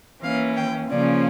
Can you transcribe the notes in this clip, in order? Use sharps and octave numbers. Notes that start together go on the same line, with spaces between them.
E3 A#3 C#4 F5
G5
C#3 F3 A#3 C#4 D5